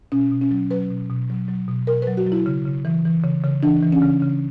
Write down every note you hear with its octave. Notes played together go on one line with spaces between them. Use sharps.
B2 C#4
B2
C#4
F#3
F#3 B4
B2
B2
F#3
F#3
B2
B2 A#4
F#3 B4
F#4
F#3
E4
C#3
C#3
E3
E3
C#3
C#3
E3 D4
E3
C#4
C#3
C#3